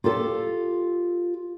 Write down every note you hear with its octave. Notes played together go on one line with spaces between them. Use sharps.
F4 G4 A4